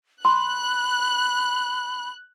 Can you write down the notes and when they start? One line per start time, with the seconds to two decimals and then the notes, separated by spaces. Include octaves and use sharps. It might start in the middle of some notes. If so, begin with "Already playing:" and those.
0.25 B5 C6 F#6